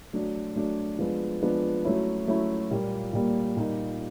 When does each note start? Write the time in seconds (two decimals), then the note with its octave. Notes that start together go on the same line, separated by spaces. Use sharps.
0.13 F#3 A3 D4
0.55 F#3 A3 D4
0.99 F3 G#3 B3 D4
1.42 F3 G#3 B3 D4
1.85 F#3 A3 C#4 E4
2.27 F#3 A3 C#4 E4
2.71 A#2 G3 A#3
3.13 A#2 G3 A#3
3.56 A#2 G3 A#3 D#4